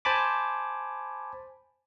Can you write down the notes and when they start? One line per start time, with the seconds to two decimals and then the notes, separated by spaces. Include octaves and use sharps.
0.05 C5 G#5 A5 B5 D6